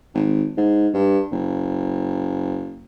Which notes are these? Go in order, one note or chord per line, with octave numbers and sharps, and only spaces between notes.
G#1
G#2
G2
F#1